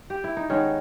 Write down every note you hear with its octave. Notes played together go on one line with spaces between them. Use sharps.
G4
E4
D#4
D#3 G#3 B3 C#4